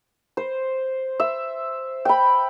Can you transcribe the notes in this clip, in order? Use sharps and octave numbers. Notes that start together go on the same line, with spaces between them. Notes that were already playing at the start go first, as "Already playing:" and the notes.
C5
E5
G5 B5